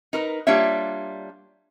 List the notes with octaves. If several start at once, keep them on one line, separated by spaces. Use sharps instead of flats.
D#4 A#4 B4
G3 A#3 D4 F4 C#5 E5